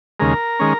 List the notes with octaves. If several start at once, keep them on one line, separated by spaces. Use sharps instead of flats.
D#2 C#3 G#3 A#4
D#3 G#3 C#4